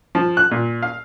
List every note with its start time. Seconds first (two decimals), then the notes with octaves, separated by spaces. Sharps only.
0.15 F3
0.37 F#6
0.51 A#2
0.82 F5